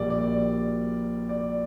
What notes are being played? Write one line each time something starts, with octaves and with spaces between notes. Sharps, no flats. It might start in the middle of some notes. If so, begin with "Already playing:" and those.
Already playing: A#1 A#2 G3 D5
D5
D5